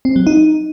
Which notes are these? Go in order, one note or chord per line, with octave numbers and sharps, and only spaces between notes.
C4
F#3
D#4